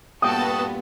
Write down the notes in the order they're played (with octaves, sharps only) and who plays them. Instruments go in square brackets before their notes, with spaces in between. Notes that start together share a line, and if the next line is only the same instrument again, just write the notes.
[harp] G2 A#2 G5 [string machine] B3 [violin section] F#4 A4 A5 [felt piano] D#6